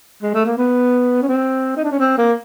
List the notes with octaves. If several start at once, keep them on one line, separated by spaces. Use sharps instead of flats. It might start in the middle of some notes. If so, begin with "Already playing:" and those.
G#3
A3
A#3
B3
C#4
C4
D#4
D4
C#4
C4
A#3